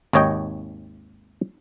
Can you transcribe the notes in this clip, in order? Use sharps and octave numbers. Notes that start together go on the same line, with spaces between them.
G#1 D#2 C#5 D#5 G5